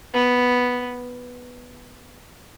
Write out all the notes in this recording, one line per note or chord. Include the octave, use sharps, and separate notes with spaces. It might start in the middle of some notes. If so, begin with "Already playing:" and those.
B3